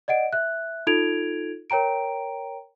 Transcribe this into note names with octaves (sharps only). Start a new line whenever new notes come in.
D5 D#5 F#5 D7
E5 F#6
D#4 F4 A4 G#6 D7 F7
A#4 C#5 G5 A#5 D7